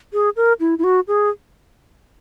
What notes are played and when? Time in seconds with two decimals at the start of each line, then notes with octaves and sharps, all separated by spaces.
0.13 G#4
0.36 A#4
0.60 E4
0.79 E4
0.84 F#4
1.08 G#4